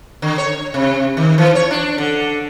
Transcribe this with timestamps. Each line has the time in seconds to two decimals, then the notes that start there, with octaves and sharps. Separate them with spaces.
0.22 D3
0.38 C#5
0.74 C3
1.17 D#3
1.38 E3
1.55 C#5
1.71 D4
1.98 D3